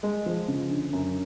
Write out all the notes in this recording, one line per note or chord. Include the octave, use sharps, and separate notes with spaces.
G#3
F3
C#3
D3
F#2